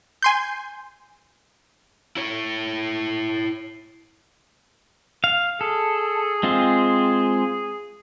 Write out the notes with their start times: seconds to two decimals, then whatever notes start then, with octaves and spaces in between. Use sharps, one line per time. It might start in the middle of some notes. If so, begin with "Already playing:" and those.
0.22 G#5 C6 G6
2.17 E4 C#5
5.24 F5
5.61 G#4 A4
6.43 G#3 C4 F4